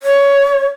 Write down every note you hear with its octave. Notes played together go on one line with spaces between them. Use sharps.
C#5